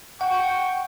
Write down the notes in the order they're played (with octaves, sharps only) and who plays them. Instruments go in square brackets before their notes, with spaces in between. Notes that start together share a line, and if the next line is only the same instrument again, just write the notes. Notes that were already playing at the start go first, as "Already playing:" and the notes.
[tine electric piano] F#5 [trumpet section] G5 C#6